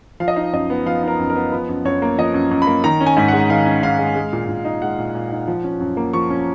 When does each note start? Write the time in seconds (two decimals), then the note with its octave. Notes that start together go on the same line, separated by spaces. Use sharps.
0.20 F3 F5
0.28 D#5
0.36 D#4 F5
0.53 F#2 D#5
0.70 B3
0.86 F3 F5
1.03 D#4 A#4
1.19 F#2
1.30 A#4
1.36 B3
1.52 F3 B4
1.69 F#2
1.85 F#2 C#5
2.02 A#3
2.18 F3 D#5
2.34 F#2
2.51 F#2
2.62 B5
2.67 A#3
2.84 D#3 A#5
3.01 C#4
3.06 G#5
3.17 G#2
3.28 G#3 F#5
3.50 D#3 F5
3.66 C#4
3.83 G#2 F5
3.99 G#3
4.16 G#3
4.33 A#2
4.49 A#2
4.65 D#4
4.82 G#3 F#5
4.99 A#2
5.15 A#2
5.32 D#4
5.48 F3
5.64 C#4
5.81 F#2
5.97 A#3
6.14 F3 C#6
6.30 C#4